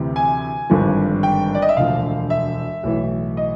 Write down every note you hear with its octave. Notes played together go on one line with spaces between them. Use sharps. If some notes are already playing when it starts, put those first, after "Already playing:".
Already playing: D2 C3 E3
G#5
G#1 G2 D3 F3
G5
D5
D#5
E5
E1 D2 D3 F3 F5
E5
B1 A2 E3
D#5